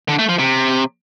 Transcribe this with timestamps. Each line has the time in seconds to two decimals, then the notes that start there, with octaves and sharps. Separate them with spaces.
0.09 D3
0.19 A3
0.29 F3
0.39 C3